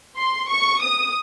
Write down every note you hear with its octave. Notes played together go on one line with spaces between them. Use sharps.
C6
C#6
D#6